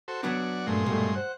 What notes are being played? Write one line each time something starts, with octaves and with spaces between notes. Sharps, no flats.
F#4 A4 C5
F#3 B3 D4 F#4 D5
G2 A#2 G#3 A3 C6
G2 B2 A3
C5 F#5